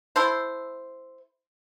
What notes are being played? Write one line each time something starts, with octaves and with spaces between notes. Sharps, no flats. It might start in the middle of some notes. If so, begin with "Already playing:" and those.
E4 A4 C5